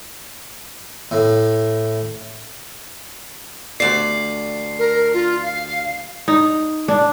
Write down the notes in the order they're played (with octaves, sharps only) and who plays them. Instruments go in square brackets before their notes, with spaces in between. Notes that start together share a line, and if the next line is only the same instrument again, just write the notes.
[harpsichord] A2
[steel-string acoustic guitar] D2 D5 [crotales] C7
[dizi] A#4
F4
F5
[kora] D#4
D4